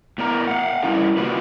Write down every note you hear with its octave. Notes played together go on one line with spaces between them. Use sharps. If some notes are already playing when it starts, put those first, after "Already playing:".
A2 B3 A#4 A#5
F5 F#5
G3 C#4 E4 A4 A#4
C3 A#3 F4 F#4 B4